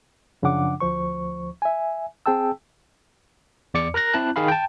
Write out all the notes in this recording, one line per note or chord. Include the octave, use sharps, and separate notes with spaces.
F#2 C#3 F3 D4 F#5 D6
D2 F3 C5 C#6
E5 G#5
C4 G#4 G5 A5 E6
E2 D5 D6 C#7
A#4 A#5 F#6 A#6
C4 E4 A5 F#6
D#3 G#4 F5 B5
G5 A5